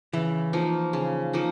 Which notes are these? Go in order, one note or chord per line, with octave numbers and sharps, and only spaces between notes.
C#3 E3
F3 A#3 D#4
C#3
F3 A#3 D#4